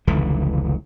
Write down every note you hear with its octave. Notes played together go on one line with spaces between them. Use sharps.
F1 C#2 D3 E3